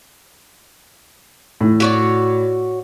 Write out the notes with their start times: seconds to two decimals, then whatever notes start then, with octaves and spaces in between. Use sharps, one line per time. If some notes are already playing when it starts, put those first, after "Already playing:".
1.61 A2
1.80 F#4 C#5 D5